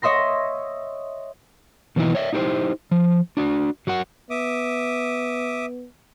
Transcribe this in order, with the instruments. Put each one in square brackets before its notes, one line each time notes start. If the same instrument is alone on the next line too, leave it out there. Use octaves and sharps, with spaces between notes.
[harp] C#5 D#5 E5 C6 A#6
[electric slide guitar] B2 D#3 E3 A#3 D#4 E4
C#5 D5 E5
D#4 E4 G4 A4 C5
F3
D4 F#4 D5
F#3 F#4 A#4 F#5
[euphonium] B3 [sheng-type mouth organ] E5 D6 D#6